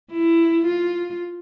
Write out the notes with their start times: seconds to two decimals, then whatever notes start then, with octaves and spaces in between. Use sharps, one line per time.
0.11 E4
0.66 F4